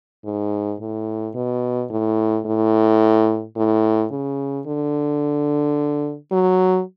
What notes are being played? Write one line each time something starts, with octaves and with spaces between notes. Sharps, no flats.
G#2
A2
B2
A2
A2
A2
C#3
D3
F#3